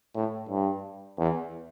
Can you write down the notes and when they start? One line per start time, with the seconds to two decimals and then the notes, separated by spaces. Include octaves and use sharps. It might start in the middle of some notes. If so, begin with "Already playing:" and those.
0.15 A2
0.49 G2
1.18 E2